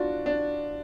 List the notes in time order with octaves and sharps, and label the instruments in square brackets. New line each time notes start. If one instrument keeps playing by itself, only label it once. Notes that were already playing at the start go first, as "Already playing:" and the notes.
Already playing: [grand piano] D4 [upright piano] F4 F#4
[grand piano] D4